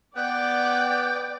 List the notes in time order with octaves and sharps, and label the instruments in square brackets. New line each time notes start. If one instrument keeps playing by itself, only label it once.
[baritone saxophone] B3 [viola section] D5 [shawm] G5 [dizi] F#6